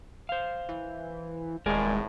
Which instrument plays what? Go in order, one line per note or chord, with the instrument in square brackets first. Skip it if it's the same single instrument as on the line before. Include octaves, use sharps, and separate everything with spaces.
[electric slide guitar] C5 F5
[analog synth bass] E3
[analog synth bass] D#1 [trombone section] G#1 E2 A2 [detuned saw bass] G#3 [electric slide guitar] A#4 D5 G#5